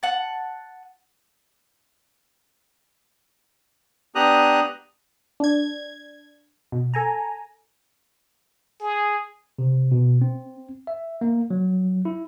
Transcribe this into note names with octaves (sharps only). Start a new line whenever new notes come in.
F#5 A5
B3 D4 G4 A#5 D#6 F#6
D4 G#6
B2
A4 G#5 A#5
G#4
C3
B2
C4
E5
A#3
F#3
E4